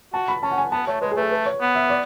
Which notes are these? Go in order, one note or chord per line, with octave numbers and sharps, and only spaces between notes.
F#4 A5
B5
C#4 A5
F#5
G#5
B3 A5
A3 C#5
G#3 B4
G#4
A3 A4 B4
B4
C#5
B3
E5
D5